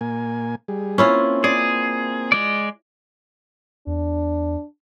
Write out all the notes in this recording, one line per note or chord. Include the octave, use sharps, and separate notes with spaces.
A#2 A#3 G#5
G3 G#4
A#3 C4 C#4 E4 F4
G#4 D5
G#3 D5
E2 D4